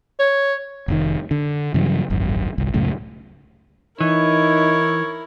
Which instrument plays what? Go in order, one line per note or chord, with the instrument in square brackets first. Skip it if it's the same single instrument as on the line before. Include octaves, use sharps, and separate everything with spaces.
[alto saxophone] C#5
[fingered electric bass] F1 A#2 D#3
D3
G2 C#3 E3 F#3
D1 G#1 F#2
G1 C2
C#2 F#2 A2 C#3
[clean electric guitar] E3 [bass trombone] D#4 [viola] E4 A#4 [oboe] C#5